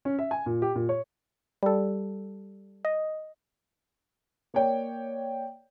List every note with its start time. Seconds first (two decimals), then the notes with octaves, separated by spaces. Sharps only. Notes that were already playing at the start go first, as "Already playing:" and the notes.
0.05 C#4
0.19 E5
0.31 G#5
0.46 A#2
0.62 G4
0.75 A#2
0.89 C#5
1.63 G3 A4
2.85 D#5
4.54 A#3 C#5 D5 G5